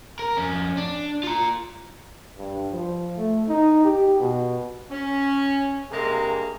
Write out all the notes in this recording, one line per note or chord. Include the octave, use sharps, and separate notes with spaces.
A#4
F2 C#4
D4
F4 A#5
G2
F3
A3
D#4
G4
B2
C#4
G2 C3 G#3 A#3 G#4 A#4